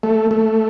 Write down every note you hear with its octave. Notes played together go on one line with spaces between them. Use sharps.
A3
A3